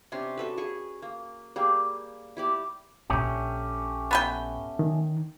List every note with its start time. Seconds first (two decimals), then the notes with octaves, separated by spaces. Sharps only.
0.12 C3 C#4 D4 C6
0.37 F#4 A4 B4
0.57 G#4 G#5 C#6
1.02 A#3
1.56 G3 A#3 G#4
2.37 E4 G4 D5
3.10 A#1 A#2 A3 C#4 G4
4.11 B3 B4 G5
4.79 D#3